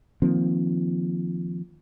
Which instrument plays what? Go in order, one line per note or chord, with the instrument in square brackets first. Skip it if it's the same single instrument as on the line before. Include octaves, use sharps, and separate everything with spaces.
[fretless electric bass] D#3 F3 A#3 C4